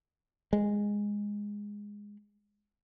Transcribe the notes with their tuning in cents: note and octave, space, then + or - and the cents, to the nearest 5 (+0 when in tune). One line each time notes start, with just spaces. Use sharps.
G#3 -10